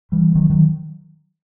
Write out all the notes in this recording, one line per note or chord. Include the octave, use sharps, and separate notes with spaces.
E3 G3
D#3 F#3
D#3 F#3